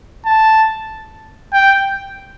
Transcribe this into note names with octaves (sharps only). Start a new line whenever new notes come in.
A5
G5